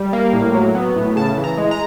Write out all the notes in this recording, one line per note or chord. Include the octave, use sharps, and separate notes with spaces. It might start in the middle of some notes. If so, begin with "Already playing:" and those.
Already playing: G3
A#3
A2
F#3
B3
A2
C#3 A5
E3
A#5
G#3
A#5